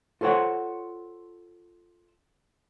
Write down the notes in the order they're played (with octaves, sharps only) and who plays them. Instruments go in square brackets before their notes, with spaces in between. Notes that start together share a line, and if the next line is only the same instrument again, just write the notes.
[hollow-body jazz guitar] F4 A4 C5 C#5 F#5